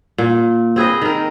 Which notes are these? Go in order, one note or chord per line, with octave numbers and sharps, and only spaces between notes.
A#2
C4 G#4 B4 D#5
D#3 A#4